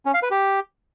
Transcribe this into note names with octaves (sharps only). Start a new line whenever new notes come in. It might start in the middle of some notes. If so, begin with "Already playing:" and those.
C#4
F5
B4
G4